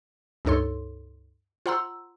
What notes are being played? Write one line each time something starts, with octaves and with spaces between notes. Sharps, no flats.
C#2 G2 D#4 A4 C#5 C6
F4 C5 F#5 A#5 C6 E6